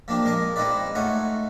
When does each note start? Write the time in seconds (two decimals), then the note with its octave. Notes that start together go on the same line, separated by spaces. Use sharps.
0.08 F3 A#3 D4 G4
0.25 G#3 A#4 D#5 D6
0.56 G#3 C4 D#4 F4 B4 D5
0.95 A3 D#4 F4 C#5 F#5